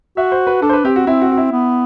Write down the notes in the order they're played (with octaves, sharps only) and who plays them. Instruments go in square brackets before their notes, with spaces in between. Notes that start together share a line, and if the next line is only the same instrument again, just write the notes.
[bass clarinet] F#4 [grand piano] E5
[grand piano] C5
B4
[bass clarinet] D4 [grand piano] A4
[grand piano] C5
B4
[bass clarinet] C4 [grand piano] G4
[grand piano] F#4
[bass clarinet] C4 [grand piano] E4
[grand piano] F#4
F#4
E4
[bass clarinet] B3